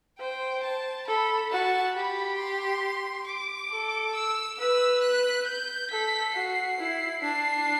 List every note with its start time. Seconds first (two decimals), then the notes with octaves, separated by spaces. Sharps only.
0.20 C5 G5
0.64 A5
1.08 A4 B5
1.51 F#4 A5
1.95 G4 B5
2.39 C6
3.27 D6
3.71 A4
4.15 E6
4.59 B4 E6
5.03 F#6
5.47 G6
5.91 A4 B6
6.35 F#4 C7
6.78 E4
7.22 D4 C7